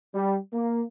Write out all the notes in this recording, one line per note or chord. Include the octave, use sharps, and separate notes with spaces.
G3
A#3